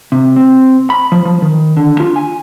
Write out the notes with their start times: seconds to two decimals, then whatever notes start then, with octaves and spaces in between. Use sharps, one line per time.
0.12 C3
0.36 C4
0.90 B5
1.12 F3
1.25 F3
1.42 D#3
1.77 D3
2.00 F4
2.16 G#5